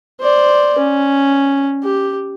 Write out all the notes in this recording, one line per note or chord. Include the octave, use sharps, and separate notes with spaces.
C5 D5
C#4
G4